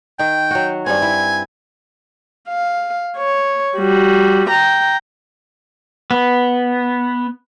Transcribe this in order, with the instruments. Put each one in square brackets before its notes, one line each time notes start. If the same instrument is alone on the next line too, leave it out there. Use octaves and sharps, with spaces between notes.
[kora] D#3 [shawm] G5
[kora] F#3 F#4
[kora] G2 C4 [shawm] G#5
[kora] E4
[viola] F5
C#5
G3 F#4
G5 A#5
[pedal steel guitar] B3